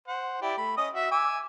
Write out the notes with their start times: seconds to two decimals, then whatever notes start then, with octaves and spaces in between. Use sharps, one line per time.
0.08 C5 F#5
0.42 E4 G4 D5
0.58 A3 B5
0.77 C#4 D#5 D#6
0.94 F#4 E5
1.11 G#5 D6 E6